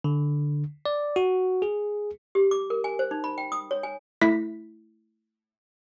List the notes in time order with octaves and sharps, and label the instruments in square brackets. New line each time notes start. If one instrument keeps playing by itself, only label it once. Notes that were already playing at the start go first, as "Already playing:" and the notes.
[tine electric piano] D3
D5
F#4
G#4
[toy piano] G4
D6
A#4
G#5
C5
D#4
B5
G5
D#6
C#5
G#5
[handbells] A3 E4 B6